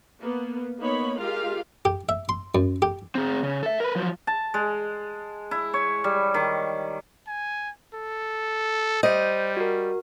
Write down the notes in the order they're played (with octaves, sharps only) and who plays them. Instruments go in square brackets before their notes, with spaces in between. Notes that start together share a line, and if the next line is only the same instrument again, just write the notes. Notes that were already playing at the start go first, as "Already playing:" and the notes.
[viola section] A#3 B3
A#3 B3 D#4 C#5 B5
G#3 F4 G4 A#4 F5
[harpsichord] G4
E5
C6
F#2
G4
[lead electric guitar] C4 G#4
C#3
A4 E5
A#4 B4
F3 F#3
[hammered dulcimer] A5
G#3
E4
C#5
G3
D#3
[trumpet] G#5
A4
[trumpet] G3 [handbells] C5 [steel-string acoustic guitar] D#5
[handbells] F#4 A#4